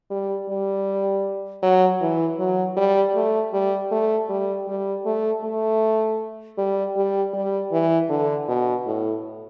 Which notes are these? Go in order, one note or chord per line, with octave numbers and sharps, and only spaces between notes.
G3
G3
F#3
E3
F#3
G3
A3
G3
A3
G3
G3
A3
A3
G3
G3
G3
E3
D3
B2
A2